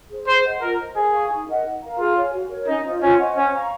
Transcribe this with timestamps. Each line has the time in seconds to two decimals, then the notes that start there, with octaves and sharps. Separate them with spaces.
0.10 G#4 C5
0.27 G#4 C5
0.44 D#5 F#5
0.61 F4 A#4
0.78 C5 D#5
0.96 G#4 A#4
1.12 F5 G#5 C#6
1.30 D#4
1.48 A#4 D#5 F#5
1.65 D#4
1.82 A#4 F5 A#5
1.99 F4 G#4
2.16 C#5 G#5
2.33 F#4
2.50 A#4 C#5
2.68 C#4 D#4
2.85 F4 C5 D#5
3.02 C#4 F4
3.19 C5 D#5 F#5
3.36 C#4 C5
3.54 F5 A#5 C#6